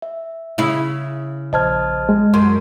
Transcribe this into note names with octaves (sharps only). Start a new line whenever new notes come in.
E5
C#3 E4
A#1 C5 D#5 A5 F6 G#6
G#3
F#2 C6